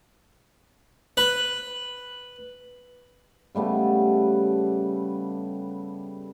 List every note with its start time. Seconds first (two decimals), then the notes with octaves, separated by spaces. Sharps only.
1.17 B4
3.55 C#3 G3 A3 B3